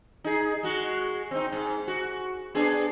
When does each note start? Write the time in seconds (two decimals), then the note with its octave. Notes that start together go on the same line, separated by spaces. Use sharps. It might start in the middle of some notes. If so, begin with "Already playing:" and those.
0.24 D#4 G#4
0.63 G#3 F#4
1.31 C4 D#4
1.52 G#2
1.88 F#4
2.55 B3 D4 G#4